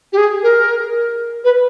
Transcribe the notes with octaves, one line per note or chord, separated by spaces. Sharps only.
G4
G#4
A#4
B4